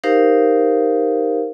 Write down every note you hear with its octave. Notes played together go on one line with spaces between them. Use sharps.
D#4 G4 A#4 C5 F5